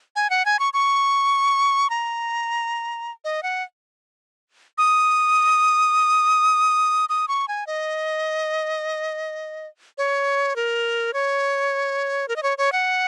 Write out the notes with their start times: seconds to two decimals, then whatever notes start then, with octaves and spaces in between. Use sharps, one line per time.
0.16 G#5
0.30 F#5
0.46 G#5
0.59 C#6
0.73 C#6
1.90 A#5
3.25 D#5
3.43 F#5
4.78 D#6
7.09 D#6
7.28 C#6
7.48 G#5
7.67 D#5
9.98 C#5
10.56 A#4
11.13 C#5
12.28 A#4
12.36 D#5
12.43 C#5
12.58 C#5
12.72 F#5